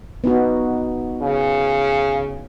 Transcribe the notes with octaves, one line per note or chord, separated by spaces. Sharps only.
B3 D#4 F#4
C#3